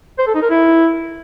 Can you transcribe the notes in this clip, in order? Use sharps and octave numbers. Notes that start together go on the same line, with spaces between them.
C5
A4
D#4
A#4
E4